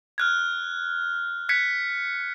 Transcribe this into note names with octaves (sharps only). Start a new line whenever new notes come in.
F6 F#6 G#6
F#6 G#6 B6 C#7